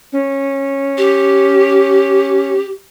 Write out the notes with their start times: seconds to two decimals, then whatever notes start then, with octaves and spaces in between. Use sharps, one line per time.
0.13 C#4
0.98 G4